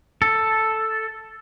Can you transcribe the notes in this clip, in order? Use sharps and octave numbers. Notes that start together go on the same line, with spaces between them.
A4